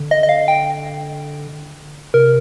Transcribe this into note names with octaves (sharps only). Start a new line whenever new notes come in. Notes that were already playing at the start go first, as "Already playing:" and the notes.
Already playing: D3
D#5
D#5
F5
G5
C3 A#4